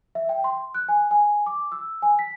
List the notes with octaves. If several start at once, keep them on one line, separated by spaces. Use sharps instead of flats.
E5
G5
C6
F#6
G#5
G#5
D6
E6
G#5
B6